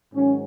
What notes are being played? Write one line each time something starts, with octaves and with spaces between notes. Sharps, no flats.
G#2 D#3 F#3 C#4